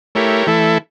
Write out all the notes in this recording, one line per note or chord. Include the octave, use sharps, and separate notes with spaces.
A3 E4 G4 A#4 C#5
E3 A3 E4 A4